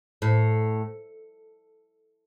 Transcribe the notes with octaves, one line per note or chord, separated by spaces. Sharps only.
A2